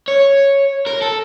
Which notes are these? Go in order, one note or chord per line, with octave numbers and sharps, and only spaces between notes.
C#5
A#4
A4